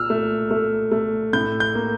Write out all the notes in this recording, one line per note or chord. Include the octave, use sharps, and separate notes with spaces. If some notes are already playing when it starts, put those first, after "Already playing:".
Already playing: A#2 E6 F6
A3
A3
A3
A2 G6
G6
A#3